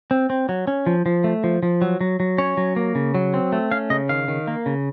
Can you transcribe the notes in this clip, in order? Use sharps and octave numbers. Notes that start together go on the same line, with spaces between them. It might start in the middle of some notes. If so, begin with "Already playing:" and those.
C4
C4
F#3
C#4
F3
F3
A3
F3
F3
F#3
F#3
F#3
C#4 C#5
F#3
A#3
C#3
F#3
C4
A3
C#4 F5
C#3 D#5
D#3 F5
D#3
A#3
C#3